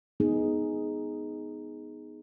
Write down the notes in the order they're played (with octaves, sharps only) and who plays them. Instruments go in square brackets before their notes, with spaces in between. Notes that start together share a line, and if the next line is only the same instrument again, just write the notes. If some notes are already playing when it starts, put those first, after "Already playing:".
[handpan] B3 D#4 G#4